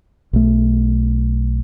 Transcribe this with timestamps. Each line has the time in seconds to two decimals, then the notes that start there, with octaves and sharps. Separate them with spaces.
0.33 B1 A3